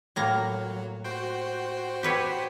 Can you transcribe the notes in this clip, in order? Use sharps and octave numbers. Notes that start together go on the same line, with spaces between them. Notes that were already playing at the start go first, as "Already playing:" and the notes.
A2 F#3 A#3 A#5
F#4 C5 G5
G4 B4 C#5